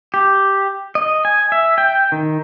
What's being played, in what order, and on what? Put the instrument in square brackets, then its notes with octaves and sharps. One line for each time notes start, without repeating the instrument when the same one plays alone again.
[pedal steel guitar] G4
D#5
G#5
E5
G5
D#3